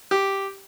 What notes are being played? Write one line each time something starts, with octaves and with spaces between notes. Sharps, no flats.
G4